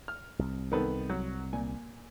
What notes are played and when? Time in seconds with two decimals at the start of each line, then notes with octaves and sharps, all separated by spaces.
0.08 F6
0.39 C2
0.72 D#3 B3 A4
1.10 F#3
1.53 A#2 G#5